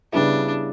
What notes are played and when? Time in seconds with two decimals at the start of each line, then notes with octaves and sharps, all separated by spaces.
0.13 C#3 G3 B3 D4 E4